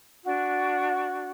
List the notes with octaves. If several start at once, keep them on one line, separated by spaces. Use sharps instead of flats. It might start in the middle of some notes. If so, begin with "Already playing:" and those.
D4 F#4